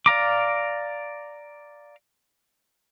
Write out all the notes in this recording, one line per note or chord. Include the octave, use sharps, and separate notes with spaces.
D5 F5 A#5 D6